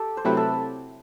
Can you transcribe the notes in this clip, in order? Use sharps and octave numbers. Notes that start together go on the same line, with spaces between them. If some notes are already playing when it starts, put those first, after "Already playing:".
Already playing: G4 A4
C5
C3 F#3 A3 C4 E4 B4
A4